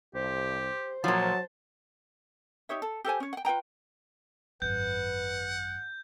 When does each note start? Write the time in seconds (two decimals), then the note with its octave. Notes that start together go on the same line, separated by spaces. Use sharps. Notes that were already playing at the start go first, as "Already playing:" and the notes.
0.15 C2 G4 C5
1.04 A#2 F3 F#3 A5
2.69 D#4 G4 C#5 E5
2.82 A4
3.05 G4 A4 C5 G#5
3.20 C#4 C#5
3.33 F#5 G5
3.45 F4 B4 G5 A#5
4.62 G#1 F#2 B4 F#5 G6